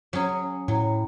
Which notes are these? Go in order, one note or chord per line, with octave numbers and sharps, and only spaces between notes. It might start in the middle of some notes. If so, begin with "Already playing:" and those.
F#3 C#4 G#4
A2 F#3